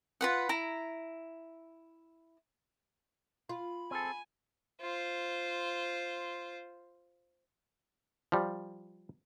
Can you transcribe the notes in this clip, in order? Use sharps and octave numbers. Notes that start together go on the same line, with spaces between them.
F4 B4 F#5
E4 A#5
F4 B5
C4 G#4 A4 G#5
F4 C5
F3 G3